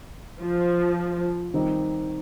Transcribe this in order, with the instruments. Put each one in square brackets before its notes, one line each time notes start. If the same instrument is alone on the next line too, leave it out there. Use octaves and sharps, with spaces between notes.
[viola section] F3
[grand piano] D#3 G3 C4 D#4 G4